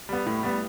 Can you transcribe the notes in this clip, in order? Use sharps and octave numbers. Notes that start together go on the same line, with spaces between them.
G3 B3
A2
G3 B3